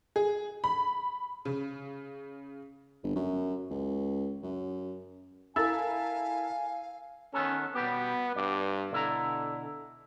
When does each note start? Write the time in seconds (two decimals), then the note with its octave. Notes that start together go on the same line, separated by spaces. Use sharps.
0.16 G#4
0.64 B5
1.45 C#3
3.03 G1
3.15 F#2
3.70 C#2
4.43 F#2
5.56 E4 A4 A#4 F5 G#5 E6 A6
7.33 D#3 B3 C#4 A4
7.75 B2 G3 B3 G4
8.36 G2 D5
8.92 B2 D3 E4 A#5